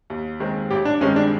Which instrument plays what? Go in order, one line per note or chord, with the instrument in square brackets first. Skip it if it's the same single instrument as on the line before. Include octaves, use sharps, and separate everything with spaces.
[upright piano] D#2
D#3 G#3 C4
[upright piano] A1 [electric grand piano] G4
[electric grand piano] D4
[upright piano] G2 D#3 G#3 C4 [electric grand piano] C#4
[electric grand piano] D4